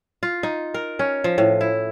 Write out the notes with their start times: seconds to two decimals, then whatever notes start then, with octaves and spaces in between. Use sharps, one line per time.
0.23 F4
0.43 D#4
0.74 A#4
0.99 C#4
1.24 F3
1.38 A2
1.61 E4